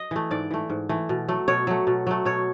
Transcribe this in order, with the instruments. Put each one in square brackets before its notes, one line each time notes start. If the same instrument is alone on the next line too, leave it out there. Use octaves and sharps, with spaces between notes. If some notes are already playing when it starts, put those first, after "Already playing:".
Already playing: [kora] D#5
E3 A3
G#2 D5
E3 A3
G#2
E3 A3
B2
F#3 A3
B2 C#5
F#3 A3
B2
F#3 A3
B2 C#5